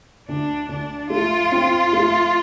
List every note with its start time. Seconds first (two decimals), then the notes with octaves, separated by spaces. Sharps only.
0.28 D2 D4
0.69 D2 D4
1.10 A3 F4
1.52 C4
1.93 A3